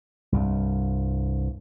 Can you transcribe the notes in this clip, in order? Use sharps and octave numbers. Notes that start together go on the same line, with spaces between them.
C2 G2